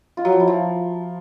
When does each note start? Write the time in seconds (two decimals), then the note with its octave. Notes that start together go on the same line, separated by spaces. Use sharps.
0.17 F4
0.25 F#3
0.32 F3
0.40 E4
0.48 F3